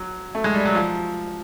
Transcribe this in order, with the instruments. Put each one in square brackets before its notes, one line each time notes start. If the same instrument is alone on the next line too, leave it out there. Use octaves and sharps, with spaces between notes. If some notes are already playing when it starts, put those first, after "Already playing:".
Already playing: [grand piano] F#3
A3
G#3
G3
F#3
F3